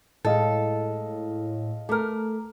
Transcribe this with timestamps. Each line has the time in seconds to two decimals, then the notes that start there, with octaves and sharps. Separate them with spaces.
0.24 A2 G#3 G#4 A4 D#5 F5
1.89 A3 A#4 D6 F6